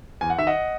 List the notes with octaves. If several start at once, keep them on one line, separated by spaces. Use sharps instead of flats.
E2 G#5
F#5
D#3 E5
D#5 F#5